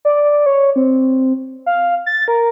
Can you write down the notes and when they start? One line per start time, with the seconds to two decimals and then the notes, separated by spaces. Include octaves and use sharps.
0.05 D5
0.46 C#5
0.76 C4
1.66 F5
2.06 A6
2.28 A#4